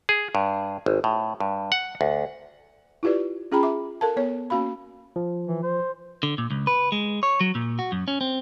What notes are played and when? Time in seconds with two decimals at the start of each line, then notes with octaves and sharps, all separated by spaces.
0.09 G#4
0.35 G2
0.86 G#1
1.04 A2
1.40 G2
1.72 F#5
2.01 D2
3.03 E4 F4 G4 B4 D5
3.52 C#4 F4 G#4 G5 A#5 B5
3.63 E5 D6
4.01 A4 A#4 F5 A5
4.17 B3 C#5
4.50 A#3 C#4 F#4 F5 B5
5.16 F3
5.48 E3
5.63 C5
6.23 D3
6.38 A#2
6.51 C#2
6.67 B4
6.92 G#3
7.23 C#5
7.41 F#3
7.55 A#2
7.79 F#4
7.92 F#2
8.08 C#4
8.21 C4